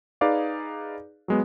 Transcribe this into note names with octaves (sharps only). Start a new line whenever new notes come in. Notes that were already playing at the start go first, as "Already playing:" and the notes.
D#4 G#4 B4 D5 F5 D6
F#3 G#3 B3